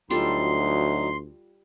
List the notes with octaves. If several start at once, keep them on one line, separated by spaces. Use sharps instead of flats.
D2 F#3 G3 D#4 F4 A4 C6